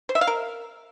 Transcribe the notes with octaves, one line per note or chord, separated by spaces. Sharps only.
C5
E5
F5
A#4